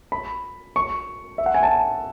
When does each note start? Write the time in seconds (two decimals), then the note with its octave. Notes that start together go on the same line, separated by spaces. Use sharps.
0.12 B5
0.76 C#6
1.38 E5
1.46 F#5
1.54 G#5
1.63 A5